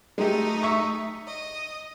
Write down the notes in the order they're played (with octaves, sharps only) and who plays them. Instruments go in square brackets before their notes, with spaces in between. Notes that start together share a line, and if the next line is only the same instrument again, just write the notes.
[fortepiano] G#3 G4 [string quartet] A3 D#4
[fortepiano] E5 C#6
[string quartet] D#5